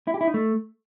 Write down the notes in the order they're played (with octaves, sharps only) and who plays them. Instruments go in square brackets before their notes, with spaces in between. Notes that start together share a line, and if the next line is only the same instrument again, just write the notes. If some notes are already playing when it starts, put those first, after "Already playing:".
[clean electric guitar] E4
G4
E4
D#4
A3